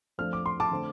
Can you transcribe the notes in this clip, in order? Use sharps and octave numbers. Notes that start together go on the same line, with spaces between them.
F2 F3 A3 D4 F6
D6
C6
A5 D6
D3 A3 C4